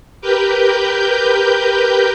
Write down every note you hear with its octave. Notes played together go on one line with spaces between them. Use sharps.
G4 A#4 B4 G6